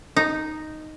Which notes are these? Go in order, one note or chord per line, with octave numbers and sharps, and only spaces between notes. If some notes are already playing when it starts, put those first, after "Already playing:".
D#4